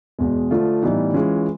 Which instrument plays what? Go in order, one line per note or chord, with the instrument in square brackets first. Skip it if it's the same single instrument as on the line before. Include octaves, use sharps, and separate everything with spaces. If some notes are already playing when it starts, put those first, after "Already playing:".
[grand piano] E2 B2 G#3
D3 F3 A3 D4 F4
A2 E3 G3 B3 D#4
E3 G#3 C#4 F4